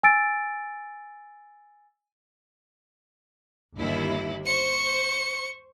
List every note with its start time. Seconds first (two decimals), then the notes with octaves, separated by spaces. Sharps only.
0.03 G#5 E6 A6 D7
3.76 G1 D#2 E4
4.46 C5 C#6 C#7